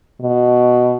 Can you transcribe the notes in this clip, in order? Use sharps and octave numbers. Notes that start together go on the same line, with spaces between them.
B2